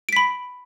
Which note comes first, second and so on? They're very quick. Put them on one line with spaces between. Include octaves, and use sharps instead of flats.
D7 B6 B5